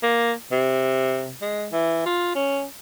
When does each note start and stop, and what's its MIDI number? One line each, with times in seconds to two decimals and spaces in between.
0.03 0.32 58
0.52 1.31 48
1.42 1.67 56
1.72 2.03 52
2.06 2.33 65
2.35 2.64 61